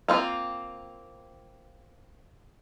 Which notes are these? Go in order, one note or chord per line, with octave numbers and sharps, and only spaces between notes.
A#3 C4 F4